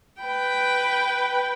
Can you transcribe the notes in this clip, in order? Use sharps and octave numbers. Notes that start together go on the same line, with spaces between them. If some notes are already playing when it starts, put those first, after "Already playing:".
B4 G5